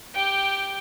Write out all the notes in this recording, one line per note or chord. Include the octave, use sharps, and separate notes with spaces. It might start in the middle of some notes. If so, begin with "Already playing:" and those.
G4 G5